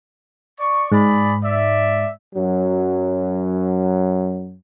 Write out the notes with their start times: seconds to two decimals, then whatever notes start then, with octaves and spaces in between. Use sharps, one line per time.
0.59 D5 C#6
0.92 G#2 G#4 D5 B5
1.44 D5 E5
2.35 F#2 F#3